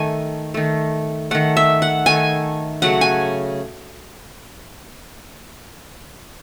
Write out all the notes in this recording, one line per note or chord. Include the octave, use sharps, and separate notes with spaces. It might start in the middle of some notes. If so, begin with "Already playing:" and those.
Already playing: D#3 A3 G#5
D#3 A3
D#3 A3 F#5
E5
F#5
D#3 A3 G#5
C#3 F#3 A3 F#5
G#5